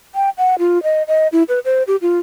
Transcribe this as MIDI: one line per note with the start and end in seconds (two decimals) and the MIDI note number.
0.15 0.30 79
0.38 0.55 78
0.59 0.82 65
0.83 1.03 75
1.08 1.28 75
1.32 1.43 64
1.49 1.59 71
1.65 1.83 72
1.87 1.96 67
2.02 2.19 65